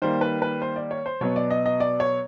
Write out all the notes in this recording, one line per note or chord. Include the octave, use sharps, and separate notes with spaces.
D#3 G3 A#3 C5
B4
B4
C5
D5
C#5
C5
B2 F#3 B3 C#5
D5
D#5
D#5
D5
C#5